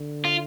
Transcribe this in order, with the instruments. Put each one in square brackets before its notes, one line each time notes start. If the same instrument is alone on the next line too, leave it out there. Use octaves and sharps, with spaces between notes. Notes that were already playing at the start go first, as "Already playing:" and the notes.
Already playing: [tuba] D3
[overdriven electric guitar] F4